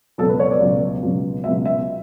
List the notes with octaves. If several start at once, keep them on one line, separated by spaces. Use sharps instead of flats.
C#2 B2 F#3 A4
B4
C#5
D5
C#2 B2 F#3
C#2 B2 F#3
C#2 B2 F#3 E5
E5